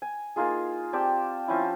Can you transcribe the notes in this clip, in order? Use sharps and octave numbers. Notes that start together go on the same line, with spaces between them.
G#5
A#3 D#4 F4 G#4
C4 G4 D5 A5
F3 C#4 E4